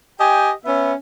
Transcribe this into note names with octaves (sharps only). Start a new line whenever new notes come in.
G4 D#5 G5 G#5
B3 C#4 E5